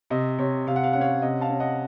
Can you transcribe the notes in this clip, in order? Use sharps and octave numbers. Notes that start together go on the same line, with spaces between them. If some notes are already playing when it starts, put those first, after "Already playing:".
C3 D#5
C3 C#5
C3 F5
F#5
F5
C#4 F#5
C#5 F5
C3 D#5 F#5
F5 A5
C#4
D#5 F#5